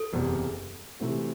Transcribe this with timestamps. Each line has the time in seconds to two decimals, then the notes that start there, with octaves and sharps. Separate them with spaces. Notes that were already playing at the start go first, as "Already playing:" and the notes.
Already playing: A4
0.13 F#1 E2 C3
1.00 C3 E3 A3 C4 F#4